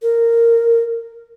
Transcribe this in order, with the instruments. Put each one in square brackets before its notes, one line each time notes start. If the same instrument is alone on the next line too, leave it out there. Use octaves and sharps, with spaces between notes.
[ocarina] A#4